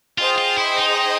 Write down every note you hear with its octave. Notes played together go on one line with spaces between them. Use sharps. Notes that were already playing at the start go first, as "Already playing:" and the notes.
F4 G#4 C5 D#5 G5
F4
E4
D#4